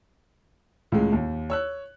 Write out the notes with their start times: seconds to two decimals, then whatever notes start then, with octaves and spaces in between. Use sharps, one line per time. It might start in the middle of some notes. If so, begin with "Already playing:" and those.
0.92 C#2 A2 G#3
1.13 D#2
1.50 C#5 E6 F#6